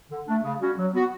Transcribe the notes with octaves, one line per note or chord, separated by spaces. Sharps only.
D3
A3 D4
C#3
G3 C#4 F#4
F#3
B3 F#4